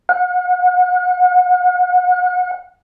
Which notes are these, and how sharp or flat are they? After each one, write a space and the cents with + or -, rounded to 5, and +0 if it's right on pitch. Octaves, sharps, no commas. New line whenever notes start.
F#5 -35